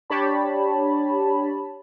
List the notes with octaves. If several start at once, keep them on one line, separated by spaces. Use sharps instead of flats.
D4 G4 C#5 A5 B5